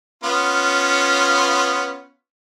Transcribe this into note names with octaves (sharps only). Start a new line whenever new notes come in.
B3 C#4 F4